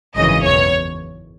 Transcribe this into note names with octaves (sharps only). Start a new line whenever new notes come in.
G#1 F#2 C#3 E3 D#5
E2 B2 C#5